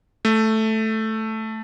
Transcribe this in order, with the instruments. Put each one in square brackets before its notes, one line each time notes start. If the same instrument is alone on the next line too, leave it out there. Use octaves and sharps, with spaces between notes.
[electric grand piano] A3